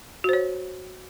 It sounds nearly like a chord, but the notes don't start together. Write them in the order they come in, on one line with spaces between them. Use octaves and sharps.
F#4 C5 C#5